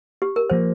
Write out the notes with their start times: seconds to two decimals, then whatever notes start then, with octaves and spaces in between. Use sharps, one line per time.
0.22 G4
0.36 A#4
0.50 F3 A#3 C5